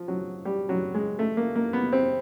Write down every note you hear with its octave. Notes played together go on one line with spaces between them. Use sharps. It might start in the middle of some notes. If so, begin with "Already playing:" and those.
Already playing: F3
F#3
G3
F#3
G#3
A3
A#3
A#3
B3
C4